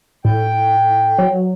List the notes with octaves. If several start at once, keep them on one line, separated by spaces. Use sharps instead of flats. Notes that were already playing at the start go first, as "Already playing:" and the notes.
A2 G5
F#3